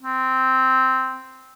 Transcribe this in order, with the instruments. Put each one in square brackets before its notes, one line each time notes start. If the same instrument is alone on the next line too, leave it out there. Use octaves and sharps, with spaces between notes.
[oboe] C4